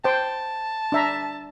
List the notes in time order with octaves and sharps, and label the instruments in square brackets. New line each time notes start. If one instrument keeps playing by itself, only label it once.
[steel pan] C5 G5 [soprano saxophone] A5
[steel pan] D4 E5 A#5